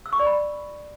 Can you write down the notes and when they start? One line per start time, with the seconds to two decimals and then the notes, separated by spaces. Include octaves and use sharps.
0.06 E6
0.13 C#6
0.20 D5
0.26 B5